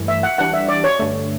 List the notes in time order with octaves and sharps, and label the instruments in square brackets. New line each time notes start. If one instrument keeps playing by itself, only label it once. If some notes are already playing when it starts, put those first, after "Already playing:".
Already playing: [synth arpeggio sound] G2 E3 A3
[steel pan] E5
F#5
[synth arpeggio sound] E3 G3 D4 [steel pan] F#5
[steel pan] E5
D5
C#5
[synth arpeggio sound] G2 D3 A3